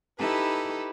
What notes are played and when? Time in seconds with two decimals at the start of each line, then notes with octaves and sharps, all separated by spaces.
0.18 D#4 E4 G4 A4 B4